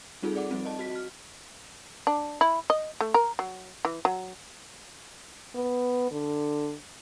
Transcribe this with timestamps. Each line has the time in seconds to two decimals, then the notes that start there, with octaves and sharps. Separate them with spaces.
0.23 G3 C4 D#4 F4 G#4 A4
0.36 D5 F#5 D6
0.51 F3 G3 C4
0.65 D#5 A5
0.79 F#4 B6
0.95 F6
2.07 D4
2.41 E4
2.70 D#5
3.01 A3
3.14 A#4
3.39 F#3
3.85 E3
4.05 F#3
5.55 B3
6.11 D3